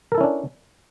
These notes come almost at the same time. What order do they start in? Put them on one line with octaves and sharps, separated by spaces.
A#4 A4 E4 C#4 D4